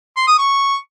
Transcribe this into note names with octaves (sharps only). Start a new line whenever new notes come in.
C6
D#6
C#6